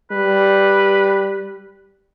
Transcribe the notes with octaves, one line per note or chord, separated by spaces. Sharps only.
G3 B4